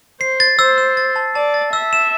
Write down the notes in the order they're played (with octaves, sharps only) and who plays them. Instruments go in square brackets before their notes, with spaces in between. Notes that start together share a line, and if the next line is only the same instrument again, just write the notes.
[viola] C5 [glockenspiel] C7
[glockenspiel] A6
[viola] C5 [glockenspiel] E6
[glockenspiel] E6
A6
A5
[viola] D5 [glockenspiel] A5
[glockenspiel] A6
[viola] E5 [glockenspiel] E6
[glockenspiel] E7